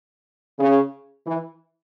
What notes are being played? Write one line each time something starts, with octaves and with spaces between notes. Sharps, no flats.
C#3
E3